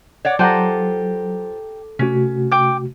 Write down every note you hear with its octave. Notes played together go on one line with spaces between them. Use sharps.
C#5 D5 F#5
F#3 F4 G4 A4 C5 F#5 A#5
C3 A3 C#4 F#4 B6
G5 D6